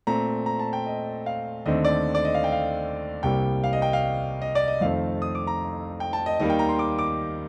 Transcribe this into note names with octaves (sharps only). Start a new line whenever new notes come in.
A#2 A3 C4 A#5
A#5
A5
G5
D#5
F5
D#2 D3 A3 C4 D#5
D5
D5
D#5
F5
G5
F5
C2 C3 G3 A#3 G5
F5
D#5
G5
F5
D#5
D5
D#5
F2 D#3 A3 C4 F5
D#6
D6
A#5
G5
A5
D#5
D#2 D#3 G3 A#3 D#5
G5
A#5
C6
D6
D6